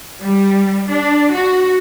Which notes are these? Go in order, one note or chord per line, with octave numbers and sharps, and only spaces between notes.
G3
D4
F#4